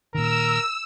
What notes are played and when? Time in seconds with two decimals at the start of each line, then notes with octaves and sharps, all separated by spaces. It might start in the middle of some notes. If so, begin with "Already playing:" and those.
0.15 A#2 D#3 A#4 E6